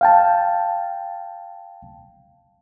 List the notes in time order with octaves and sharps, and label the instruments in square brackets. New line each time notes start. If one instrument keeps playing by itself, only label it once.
[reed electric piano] F5 G5 A5